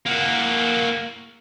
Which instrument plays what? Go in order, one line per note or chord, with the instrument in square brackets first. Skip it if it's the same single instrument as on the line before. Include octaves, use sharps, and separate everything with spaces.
[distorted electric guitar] A#3 F#4